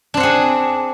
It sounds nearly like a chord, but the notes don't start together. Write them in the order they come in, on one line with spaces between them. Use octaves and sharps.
D4 C4 F#5 G#4